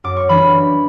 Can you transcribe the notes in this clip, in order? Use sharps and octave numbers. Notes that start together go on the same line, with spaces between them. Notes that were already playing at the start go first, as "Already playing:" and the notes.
F#2 D6
C#6
E3 G3 D4 B5